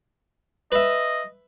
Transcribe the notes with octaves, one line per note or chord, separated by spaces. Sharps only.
B4 D#5 E5